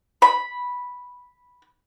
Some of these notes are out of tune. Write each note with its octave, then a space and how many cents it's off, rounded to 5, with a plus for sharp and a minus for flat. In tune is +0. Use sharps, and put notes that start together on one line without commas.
B5 -5